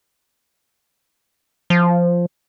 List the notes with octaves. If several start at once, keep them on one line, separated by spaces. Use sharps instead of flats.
F3